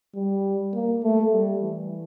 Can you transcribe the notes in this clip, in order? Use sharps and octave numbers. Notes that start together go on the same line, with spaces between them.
G3
A#3
A3
G3
E3